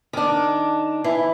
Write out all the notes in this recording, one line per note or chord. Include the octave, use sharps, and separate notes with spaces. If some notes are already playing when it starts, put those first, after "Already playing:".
D#3 D4
E3 E4